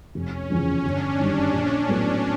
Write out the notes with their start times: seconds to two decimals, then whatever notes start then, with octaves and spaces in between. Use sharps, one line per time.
0.15 F1 C#4
0.50 E2 C#3 F3 C#4
0.84 G1 D4
1.19 F#2 D#3 G3
1.53 A#1
1.88 A2 F#3 B3